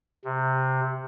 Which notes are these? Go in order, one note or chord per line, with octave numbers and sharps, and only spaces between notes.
C3